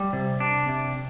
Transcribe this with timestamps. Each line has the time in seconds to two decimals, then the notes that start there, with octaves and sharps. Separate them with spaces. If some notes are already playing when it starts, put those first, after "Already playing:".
Already playing: G3
0.13 C3
0.40 D4
0.68 C3